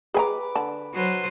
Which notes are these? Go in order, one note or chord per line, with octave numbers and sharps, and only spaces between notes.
G#4 B4 G#5 A#5 D6
D3 A5
F#3 B4 C5